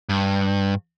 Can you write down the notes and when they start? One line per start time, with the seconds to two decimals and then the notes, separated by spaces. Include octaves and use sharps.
0.09 G2